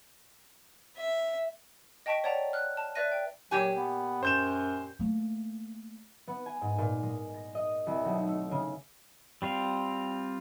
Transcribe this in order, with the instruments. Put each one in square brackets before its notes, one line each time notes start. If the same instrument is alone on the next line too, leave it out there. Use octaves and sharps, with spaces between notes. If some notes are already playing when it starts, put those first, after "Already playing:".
[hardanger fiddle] E5
[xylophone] D#5 G5 A5 C#6 B6 D7
C#5 D5 F#5 G5 A5 A#5
F6 F#6
A5
B4 D5 E5 F#6 A#6 D#7
G5
[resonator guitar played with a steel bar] A#2 G4 G#5 [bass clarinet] F#3
[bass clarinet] B3
[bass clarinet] F#2 [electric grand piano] C5 G6 E7
[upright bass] A3 A#3
[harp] B3
G#5
G#2
A#2
G#3
A#6
D#5
C2
B1
A3
C#3
[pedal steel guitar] G3 C4 F4